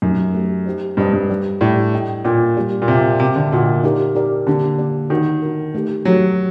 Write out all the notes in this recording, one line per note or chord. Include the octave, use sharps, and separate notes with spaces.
F#2 A3 D#4 G4
A3 D#4 G4
D#4 G4 C5 D#5
G2 D#4 G4 C5 D#5
G2
G3 D4 G4 D5
A2 G3 D4 G4 D5
D4 A4 D#5 G5
A#2 D4 A4 D#5 G5
G3 A#3 D4 G4 D5
A#2
C3 G3 A#3 D4 G4 D5
C3 F#4 A#4 D#5 G5
D3
A#2 F#4 A#4 D#5 G5
D#4 G4 A#4 D5
D#4 G4 A#4 D5
D3 A#3 D4 G4 D5
A#3 D4 G4 D5
D#3 D4 F#4 A#4
D4 F#4 A#4
A3 D#4 G4
F#3 A3 D#4 G4